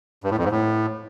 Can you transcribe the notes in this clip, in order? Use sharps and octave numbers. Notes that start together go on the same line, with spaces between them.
G2
A2
F2
G#2
A2